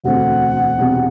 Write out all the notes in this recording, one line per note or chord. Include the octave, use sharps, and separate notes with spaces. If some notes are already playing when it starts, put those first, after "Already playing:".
E1 D2 D3 A3 C4 F#5
E1 E2 C3 G3 C4